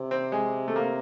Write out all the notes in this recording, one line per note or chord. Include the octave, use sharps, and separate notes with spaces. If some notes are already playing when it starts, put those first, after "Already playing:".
Already playing: C3
C4
G#3
A3
A#3